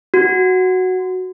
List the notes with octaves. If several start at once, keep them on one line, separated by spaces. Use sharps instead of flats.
F#4